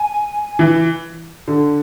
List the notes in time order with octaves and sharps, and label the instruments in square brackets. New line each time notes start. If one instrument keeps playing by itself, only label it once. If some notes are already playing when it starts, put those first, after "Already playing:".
Already playing: [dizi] G#5
[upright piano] E3
D3